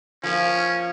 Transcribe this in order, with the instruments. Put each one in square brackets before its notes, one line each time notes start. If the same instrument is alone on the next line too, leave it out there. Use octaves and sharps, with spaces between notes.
[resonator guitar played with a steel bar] F3 A#3 [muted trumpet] C#4